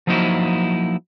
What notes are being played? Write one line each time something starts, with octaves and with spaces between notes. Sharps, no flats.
F3 F#3 A#3 D#4 E4